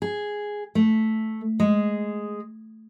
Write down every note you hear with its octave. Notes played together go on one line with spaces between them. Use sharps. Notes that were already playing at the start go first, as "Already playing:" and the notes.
G#4
A3
G#3